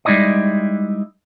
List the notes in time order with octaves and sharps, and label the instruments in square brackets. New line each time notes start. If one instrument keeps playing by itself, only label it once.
[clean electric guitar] G3 G#3 D#4 E4 D5 D#5